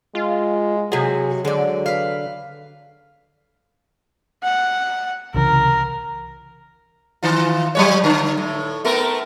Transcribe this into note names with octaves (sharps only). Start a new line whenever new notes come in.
G#3 F4
C3 F#3 F#4 G#4
D3 G#3 D5
B4 F5
F#5
C2 C#3 E3 A#4
D#3 F4
F#3 G3 C#5
D3
A2
A3 B3 A#4